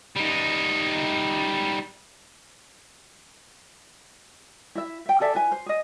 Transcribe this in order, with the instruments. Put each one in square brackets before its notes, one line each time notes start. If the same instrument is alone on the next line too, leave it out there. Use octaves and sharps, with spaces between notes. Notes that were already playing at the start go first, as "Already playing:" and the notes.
[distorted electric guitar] G3 D#4
[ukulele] E4 E5
E5 G5
G#4 A4 D5 E5
E4 B4 G#5
C5
G#4 D#5